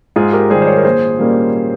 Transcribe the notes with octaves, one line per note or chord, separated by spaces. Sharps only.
G#2 F4 G#4
G4 A#4
D#3 G3 G#4 C5
C5
A#4 C#5
A#4
A#1 G#4 C5
A#2 G3 A#3 C#4